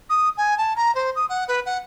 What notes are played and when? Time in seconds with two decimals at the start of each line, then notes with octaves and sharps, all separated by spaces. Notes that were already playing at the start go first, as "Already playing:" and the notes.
0.09 D#6
0.37 G#5
0.57 A5
0.75 A#5
0.94 C5
1.15 D#6
1.29 F#5
1.48 B4
1.65 F#5